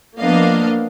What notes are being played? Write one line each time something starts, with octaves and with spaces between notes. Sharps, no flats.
F3 A#3 B3 D4 D#5 F5